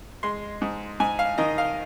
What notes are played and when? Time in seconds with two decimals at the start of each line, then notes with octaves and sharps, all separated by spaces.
0.23 G#3 C6
0.61 G#2
1.00 G#2 G#5
1.19 F5
1.38 D#3 D#5
1.58 F5